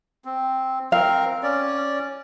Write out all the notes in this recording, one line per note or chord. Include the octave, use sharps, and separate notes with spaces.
C4
C4 A#4 F5
C#4 D5